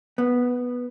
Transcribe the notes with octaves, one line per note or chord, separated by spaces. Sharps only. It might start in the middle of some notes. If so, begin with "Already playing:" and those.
B3